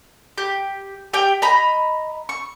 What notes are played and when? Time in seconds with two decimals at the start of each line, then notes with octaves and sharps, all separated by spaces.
0.38 G4
1.13 G4 G5
1.42 D#5 A#5 B5
2.29 C#6